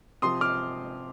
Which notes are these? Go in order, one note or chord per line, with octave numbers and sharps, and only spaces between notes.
C3 F3 C6 D#6
D6 F6